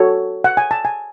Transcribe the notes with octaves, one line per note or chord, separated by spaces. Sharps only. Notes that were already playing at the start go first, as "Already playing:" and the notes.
Already playing: F#4 A4 C#5
F#5
G#5
A5
G#5